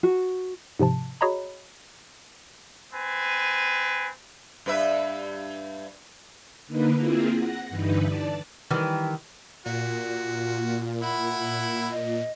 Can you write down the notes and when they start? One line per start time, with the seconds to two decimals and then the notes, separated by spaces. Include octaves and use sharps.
0.03 F#4
0.79 G#2 C3 F3 A5
1.21 F#4 G#4 C#5 D#5 A#5 B5
2.92 C4 B4 G#5
4.66 G2 B4 E5
6.67 D3 A#3 D#4 B4
6.98 A#3 C4 E4 F4 G#4
7.35 F#5 A#6
7.69 G2 D3 E3 D#4 B4
8.04 D5 A5
8.71 D#3 E3 G3
9.66 A#2 F4 F#4
11.02 E4 F#5 B5
11.92 D#5